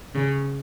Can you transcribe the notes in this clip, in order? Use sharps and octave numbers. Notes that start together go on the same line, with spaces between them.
C#3